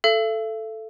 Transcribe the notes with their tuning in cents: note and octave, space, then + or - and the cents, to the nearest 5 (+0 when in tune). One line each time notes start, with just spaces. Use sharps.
A4 +0 E5 +45